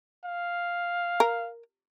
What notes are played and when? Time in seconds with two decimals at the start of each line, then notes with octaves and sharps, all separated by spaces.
0.25 F5
1.20 A#4